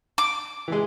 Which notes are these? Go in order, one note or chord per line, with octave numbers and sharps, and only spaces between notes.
D6
E3 G#3